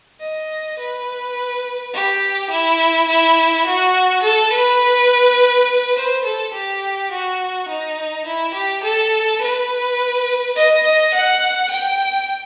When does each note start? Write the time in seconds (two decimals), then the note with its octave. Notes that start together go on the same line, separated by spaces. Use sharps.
0.20 D#5
0.78 B4
1.93 G4
2.50 E4
3.08 E4
3.66 F#4
4.22 A4
4.52 B4
5.96 C5
6.24 A4
6.53 G4
7.10 F#4
7.68 D#4
8.25 E4
8.54 G4
8.83 A4
9.41 B4
10.56 D#5
10.84 D#5
11.14 F#5
11.70 G5